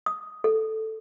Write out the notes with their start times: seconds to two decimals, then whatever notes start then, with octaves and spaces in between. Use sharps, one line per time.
0.06 D#6
0.44 A4